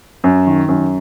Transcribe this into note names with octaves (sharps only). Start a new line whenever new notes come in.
F#2
D#3
F#2